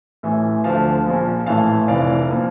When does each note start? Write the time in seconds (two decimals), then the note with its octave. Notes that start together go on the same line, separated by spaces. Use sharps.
0.23 A1 A2 E3
0.64 D2 D3 F3 F5 A5
1.06 A#1 A#2 F3
1.46 A1 A2 E3 F5 A5
1.88 F1 F2 E3 D5 F5
2.29 A#2 F3